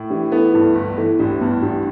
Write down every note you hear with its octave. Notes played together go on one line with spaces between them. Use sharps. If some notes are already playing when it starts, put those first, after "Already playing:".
Already playing: A2
E3 D4 G4
B3 E4 A4
G2 E4 A4
G1
E3 E4 A4
A1 D4 G4
G2 B3 E4
A1 D4 G4